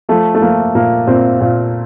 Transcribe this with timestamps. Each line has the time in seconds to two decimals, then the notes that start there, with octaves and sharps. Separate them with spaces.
0.09 F3 A3
0.35 A3
0.42 F3 A#3
0.75 A#2 A#3
1.07 A#2 C4
1.41 A#2